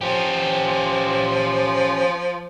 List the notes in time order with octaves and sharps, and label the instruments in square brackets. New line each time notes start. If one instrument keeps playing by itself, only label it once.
[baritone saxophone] F3 [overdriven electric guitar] C#4 G4